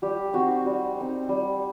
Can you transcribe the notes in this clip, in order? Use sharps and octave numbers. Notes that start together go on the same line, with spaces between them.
G3 G4
C4 D#4 F#4
G3
C4 D#4
G3